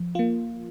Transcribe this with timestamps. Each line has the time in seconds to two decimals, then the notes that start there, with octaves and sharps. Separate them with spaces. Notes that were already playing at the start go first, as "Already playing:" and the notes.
Already playing: F3
0.15 A#3 F4